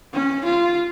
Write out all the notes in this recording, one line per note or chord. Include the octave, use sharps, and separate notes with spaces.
C#4
F4